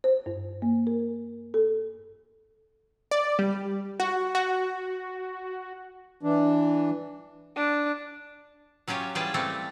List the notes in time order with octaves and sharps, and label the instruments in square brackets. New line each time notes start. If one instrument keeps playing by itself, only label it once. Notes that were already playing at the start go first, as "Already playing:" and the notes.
[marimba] C5
G2
A#3
A#4
A4
[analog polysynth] D5
G3
F#4
F#4
[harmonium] E3 D4
[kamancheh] D4
[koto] F#3 C#4 F4 G4 C#5
E3 G3 F4 G#4 G5 A5
G3 A3 C4 A4